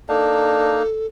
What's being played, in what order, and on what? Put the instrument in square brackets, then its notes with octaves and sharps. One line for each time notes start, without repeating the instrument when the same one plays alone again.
[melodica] A#3 D#4 [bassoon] D4 [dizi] A4